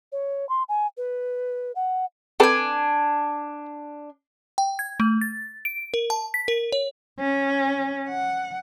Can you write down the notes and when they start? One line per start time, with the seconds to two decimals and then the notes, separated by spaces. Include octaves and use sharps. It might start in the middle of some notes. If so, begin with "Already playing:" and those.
0.12 C#5
0.49 C6
0.69 G#5
0.97 B4
1.76 F#5
2.40 C4 D4 A4 B4 G#5
4.58 G5
4.79 G#6
5.00 A3
5.21 A6
5.65 D7
5.94 A#4
6.10 A5
6.34 B6
6.48 A#4
6.72 C#5
7.19 C#4
8.08 F#5